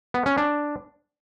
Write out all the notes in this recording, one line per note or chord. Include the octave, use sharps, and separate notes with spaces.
B3
C#4
D4